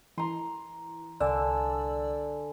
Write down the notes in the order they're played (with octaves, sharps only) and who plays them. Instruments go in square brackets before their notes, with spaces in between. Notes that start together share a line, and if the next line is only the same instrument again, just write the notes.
[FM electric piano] E3 [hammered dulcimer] A#5 C6
[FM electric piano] C2 D5 E6 [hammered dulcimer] D3 G#5